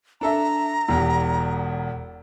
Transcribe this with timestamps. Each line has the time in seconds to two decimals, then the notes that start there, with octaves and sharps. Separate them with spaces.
0.21 D4 A4 E5 A#5
0.88 E1 E2 G4